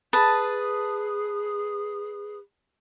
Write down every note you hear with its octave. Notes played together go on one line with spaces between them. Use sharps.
G#4 B4 A5 D#6